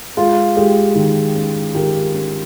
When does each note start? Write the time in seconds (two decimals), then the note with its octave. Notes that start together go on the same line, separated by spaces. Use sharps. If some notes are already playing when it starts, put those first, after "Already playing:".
0.17 G#3 F4
0.56 G#3 G4
0.95 D#3
1.35 C#4
1.75 D#3 G4 A#4
2.14 C#4